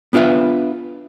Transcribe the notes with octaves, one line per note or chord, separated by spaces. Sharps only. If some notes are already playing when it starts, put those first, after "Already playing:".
B3 D4 F4 B4 E5